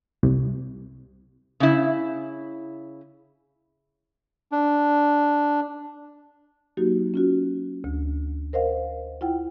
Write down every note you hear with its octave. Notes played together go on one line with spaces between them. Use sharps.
C2
C#3 E4
D4
F#3 A#3 D#4 F#4 G4
C#4 F4 F#4
D2
A#4 C5 D#5 F5 F#5
E4 F4 F#5 G5